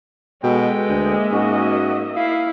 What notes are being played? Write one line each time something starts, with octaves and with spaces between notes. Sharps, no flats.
B2 G#3 A4 B4 G5
D2 A#3 D#5 E5
G#2 C#4 F#4
E4 F5